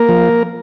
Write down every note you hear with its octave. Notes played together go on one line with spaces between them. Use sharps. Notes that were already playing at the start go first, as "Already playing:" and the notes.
Already playing: A#3 A#4
F3